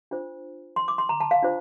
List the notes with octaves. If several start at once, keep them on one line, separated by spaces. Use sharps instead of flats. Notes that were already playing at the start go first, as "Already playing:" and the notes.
D4 F4 C5
C6
D6
C6
A#5
A5
F5
D4 F4 C5